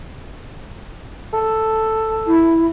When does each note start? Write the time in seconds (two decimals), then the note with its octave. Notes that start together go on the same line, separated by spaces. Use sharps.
1.34 A4
2.27 E4